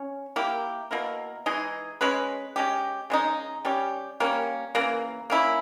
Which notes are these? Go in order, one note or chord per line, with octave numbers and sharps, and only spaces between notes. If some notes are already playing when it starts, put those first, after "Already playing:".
Already playing: C#4
A#3 E4 G4
B2 A#3 E4 A#4
E3 G#3 D#4 G#4
G#3 C#4 G#4 B4
G#3 C#4 G4
C#3 G#3 D#4
G3 C#4 G4
G3 A#3 C#4
C#3 E3 A#3
A#3 C#4 E4